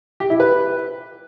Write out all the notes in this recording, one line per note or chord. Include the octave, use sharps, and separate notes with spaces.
G4
E4
B4